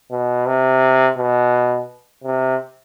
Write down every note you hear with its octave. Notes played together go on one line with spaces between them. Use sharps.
B2
C3
B2
C3